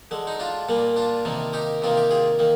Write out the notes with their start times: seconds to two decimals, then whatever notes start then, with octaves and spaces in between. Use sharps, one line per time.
0.11 D3 G#3
0.27 D#4
0.39 D4 F4
0.68 A#2 G3 A#3
0.96 D4 F4
1.25 C3 D#3 A#3
1.53 D#4 G4
1.82 C3 D#3 A#3 F4
1.97 G4
2.11 F4 G#4
2.39 D#3 A#3